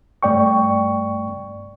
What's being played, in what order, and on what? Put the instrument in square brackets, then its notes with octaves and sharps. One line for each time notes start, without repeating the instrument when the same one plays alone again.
[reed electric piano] G2 A3 D5 G5 C#6